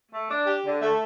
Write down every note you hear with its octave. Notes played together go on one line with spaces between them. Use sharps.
A3
D4
G4
D3
A3